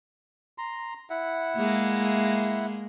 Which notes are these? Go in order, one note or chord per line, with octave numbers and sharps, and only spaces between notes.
A#5 C6
E4 E5 F#5
G#3 A#3